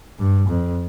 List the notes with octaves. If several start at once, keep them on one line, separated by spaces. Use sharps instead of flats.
G2
F2